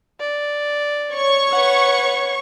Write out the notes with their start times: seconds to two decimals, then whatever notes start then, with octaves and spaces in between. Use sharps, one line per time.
0.20 D5
1.11 C#5 C#6
1.52 B4 F#5